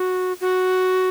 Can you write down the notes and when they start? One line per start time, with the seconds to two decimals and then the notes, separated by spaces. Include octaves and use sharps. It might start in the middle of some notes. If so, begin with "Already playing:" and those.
Already playing: F#4
0.41 F#4